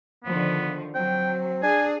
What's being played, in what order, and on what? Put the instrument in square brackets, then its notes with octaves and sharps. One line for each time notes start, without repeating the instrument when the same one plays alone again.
[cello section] D3 D#3 F3 [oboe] B3
[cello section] F#3 [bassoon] C4 [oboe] G5
[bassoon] D4 [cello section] G#4 [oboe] G#5